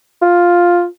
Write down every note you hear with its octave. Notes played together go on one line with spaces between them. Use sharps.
F4